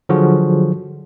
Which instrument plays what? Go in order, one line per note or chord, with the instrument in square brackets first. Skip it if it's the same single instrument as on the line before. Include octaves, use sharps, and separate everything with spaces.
[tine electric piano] D3 F3 F#3 F4 F#4 G#4